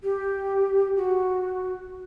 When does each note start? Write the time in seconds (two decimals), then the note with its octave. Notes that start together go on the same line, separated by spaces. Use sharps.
0.03 G4
0.97 F#4